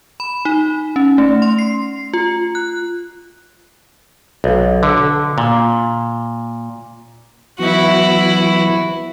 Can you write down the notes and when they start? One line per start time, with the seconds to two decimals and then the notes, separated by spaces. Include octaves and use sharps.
0.20 B5
0.45 D#4
0.96 C#4
1.18 A3
1.42 C6
1.59 C7
2.14 F4
2.55 F#6
4.44 B1
4.83 D3
5.38 A#2
7.59 E3 F#3 B3 E4 F#4